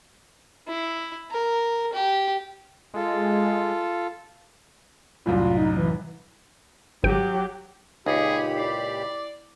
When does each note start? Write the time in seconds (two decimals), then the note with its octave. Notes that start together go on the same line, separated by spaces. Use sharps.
0.68 E4
1.31 A#4
1.93 G4
2.94 G#3 F4 A4
5.26 C2 F#2 A2 F4
5.57 D#4
5.77 E3
7.04 G#1 F#3 G4 G5
8.06 C#2 A#2 D#4 G4 G#4 B5 C#7
8.58 E4 D5 C7